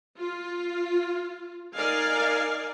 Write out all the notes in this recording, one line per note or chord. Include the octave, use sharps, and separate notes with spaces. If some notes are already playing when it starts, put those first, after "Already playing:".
F4
D#4 A#4 D5 D#5 F5 G#5